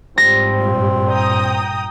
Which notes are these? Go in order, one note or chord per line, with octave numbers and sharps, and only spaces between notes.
G#2 F3 G3 C4 A#6
G2 A#2
G5 A#5 D#6